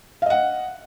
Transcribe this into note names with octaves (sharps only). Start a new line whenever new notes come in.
D#5 F5 F#5